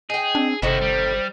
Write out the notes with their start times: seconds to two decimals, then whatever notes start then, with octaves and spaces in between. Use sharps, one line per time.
0.10 D#4 G#4 G5
0.35 C4 D4
0.62 G1 C3 D#3 A3 E4 F#4 C5
0.81 G3